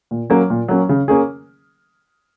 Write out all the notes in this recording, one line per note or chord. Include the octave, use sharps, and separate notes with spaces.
A#2
F#3 A#3 C#4
A#2
F#3 A#3 C#4
C#3
A#3 C#4 G#4